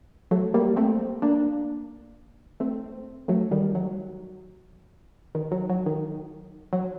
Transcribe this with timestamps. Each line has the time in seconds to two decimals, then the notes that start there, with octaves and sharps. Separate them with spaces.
0.31 F#3 A3
0.54 G3 A#3
0.76 A3 C4
1.22 A#3 D4
2.60 A3 C4
3.28 F#3 A3
3.51 D#3 G3
3.75 F#3
5.35 D#3
5.51 F#3
5.69 F#3
5.86 D#3
6.73 F#3